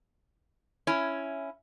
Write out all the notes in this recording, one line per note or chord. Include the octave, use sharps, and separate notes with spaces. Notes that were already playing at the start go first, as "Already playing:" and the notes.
C#4 E4